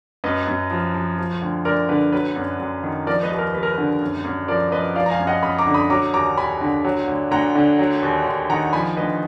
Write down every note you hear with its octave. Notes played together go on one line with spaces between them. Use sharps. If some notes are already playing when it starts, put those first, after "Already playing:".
F#2 B4 D#5
F#2
F3
F3
F3
D2
D2 A#4 D5
D3 B4
F#3 B4
F#2
F#2
D#3
F3 A#4 D5
B4 D#5
D#2
A#4
D#2 B4
A#4
B4
D3
F#2
F#2
F3 A#4 D5
F3 B4 D#5
F3 D5 F5
A#5
F5 G#5
F#2
D#5 F#5
F#2 B5 D#6
A#5 D6
D3
B5 D#6
F#3 A#5 D6
D#2 A#5 D6
D#2 G#5 B5
D3
F#3
D2
D2 F#5 A#5
D3
F#3
D#2
D#2
D#3 F#5 A#5
F3 G#5 B5
D2 B4 D#5